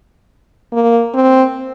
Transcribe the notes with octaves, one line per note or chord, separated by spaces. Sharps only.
A#3
C4